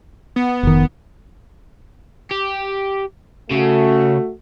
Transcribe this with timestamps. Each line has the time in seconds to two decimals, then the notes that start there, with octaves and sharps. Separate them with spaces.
0.36 B3
0.63 F1 D#3
2.31 G4
3.51 C#3 A3 F#4